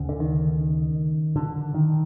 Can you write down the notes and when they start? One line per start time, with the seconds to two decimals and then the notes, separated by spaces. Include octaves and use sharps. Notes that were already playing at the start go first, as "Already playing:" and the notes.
Already playing: D2 C#3
0.09 D3
0.20 D#3
1.36 D3
1.74 D#3